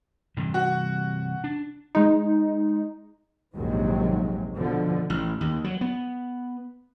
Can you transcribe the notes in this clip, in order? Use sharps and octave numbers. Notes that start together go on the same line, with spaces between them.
C3 E3 G3
F#4
D4
G#3 D#4
A#1 D#2 G#2 C3 F#3 G#3
B2 D3 F3
A1
D#2
F#3
B3